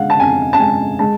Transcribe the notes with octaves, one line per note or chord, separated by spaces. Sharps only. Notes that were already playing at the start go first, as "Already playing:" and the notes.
Already playing: D3 G#3 F5 F#5
A5
F2 G#5
A5
G#3 G#5
G#3 A5